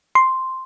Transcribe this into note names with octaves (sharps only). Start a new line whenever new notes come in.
C6